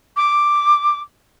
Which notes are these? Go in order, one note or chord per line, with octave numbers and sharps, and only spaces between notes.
D6